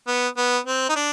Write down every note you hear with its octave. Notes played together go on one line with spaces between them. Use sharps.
B3
B3
C4
D#4
D4